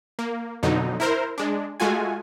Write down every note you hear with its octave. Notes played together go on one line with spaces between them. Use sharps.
A#3
F2 B2 D3 F#3 D#4
E4 A#4 C5
G#3 D4
G#3 A3 F4 F#4 G#5